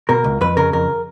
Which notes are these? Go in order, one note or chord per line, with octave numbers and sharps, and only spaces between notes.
B2 A#4
C#2
F2 B4
C#3 A#4
F2 A#4